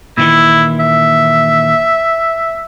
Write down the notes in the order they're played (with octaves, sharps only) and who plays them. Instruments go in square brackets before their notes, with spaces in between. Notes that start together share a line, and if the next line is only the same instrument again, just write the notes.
[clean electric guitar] A#2 D#3 E3 [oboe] E4
[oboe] E5